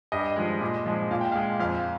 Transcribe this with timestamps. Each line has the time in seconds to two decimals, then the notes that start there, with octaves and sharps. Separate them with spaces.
0.12 G2 D#5
0.36 F3 G#3
0.61 A#2
0.86 F3 G#3
1.11 A#2 F5
1.21 G5
1.32 G#3 F5
1.60 F2 F5